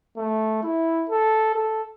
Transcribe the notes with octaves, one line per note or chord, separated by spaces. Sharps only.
A3
E4
A4
A4